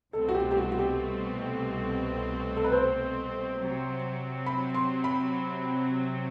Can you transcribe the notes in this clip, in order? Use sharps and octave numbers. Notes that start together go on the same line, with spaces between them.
C2 B2 A3 C4 A4
F#4
G4
G4
F#4
F#4
G4
A4
B4
C5
C3 F#3 C4
B5
C6
B5